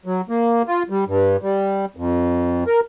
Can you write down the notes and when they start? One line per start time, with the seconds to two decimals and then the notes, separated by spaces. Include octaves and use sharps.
0.06 F#3
0.29 A#3
0.67 F4
0.90 G3
1.08 G2
1.42 G3
1.97 F2
2.67 A#4